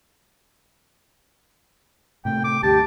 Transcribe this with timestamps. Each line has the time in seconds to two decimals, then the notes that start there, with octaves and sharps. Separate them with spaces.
2.25 A2 C3 A3 G5
2.44 D6
2.63 D2 G2 G4 A5